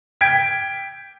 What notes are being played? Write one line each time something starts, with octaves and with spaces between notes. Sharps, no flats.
G5 G#6 B6 D7